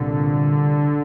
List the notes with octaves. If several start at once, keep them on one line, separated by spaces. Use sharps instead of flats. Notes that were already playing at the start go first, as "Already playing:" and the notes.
Already playing: C2 A#2 D3